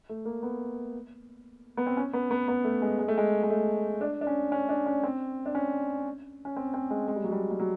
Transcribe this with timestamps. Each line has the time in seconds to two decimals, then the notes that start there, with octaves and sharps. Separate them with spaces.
0.09 A3
0.25 A#3
0.43 B3
1.77 B3
1.87 C4
1.97 C#4
2.13 B3
2.31 B3
2.48 B3
2.64 A3
2.82 G#3
2.99 G#3
3.08 A3
3.18 G#3
3.43 G#3
3.50 A3
4.01 D4
4.21 D4
4.27 C#4
4.52 C#4
4.69 D4
4.86 C#4
5.03 C4
5.46 D4
5.55 C#4
6.45 C#4
6.56 C4
6.74 C4
6.91 G#3
7.08 G#3
7.16 G3
7.24 F#3
7.32 G3
7.51 G3
7.60 F#3